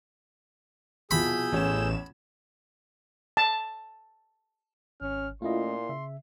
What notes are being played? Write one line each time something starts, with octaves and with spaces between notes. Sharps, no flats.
C2 B2 F3 G#4 B5 E6 G6
A1 E2 C#4 E7
A5
G#1 C#4 F6
A#2 A3 C#4 E4 F4 D#5 C6
C#3 E5